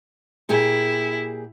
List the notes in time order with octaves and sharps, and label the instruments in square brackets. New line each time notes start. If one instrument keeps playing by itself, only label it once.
[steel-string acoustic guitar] A#2 G4 G#4 [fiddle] E4